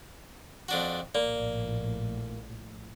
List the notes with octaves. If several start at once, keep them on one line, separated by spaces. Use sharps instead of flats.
F2 D4 F#4
A#1 A2 A#3 D5